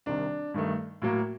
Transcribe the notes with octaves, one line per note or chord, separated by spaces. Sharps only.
C2 C3 D#3 D4
G2 D#3 A3
A2 F#3 A#3